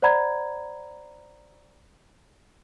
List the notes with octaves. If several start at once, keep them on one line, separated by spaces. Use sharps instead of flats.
C5 D5 F#5 A#5 B5 G#6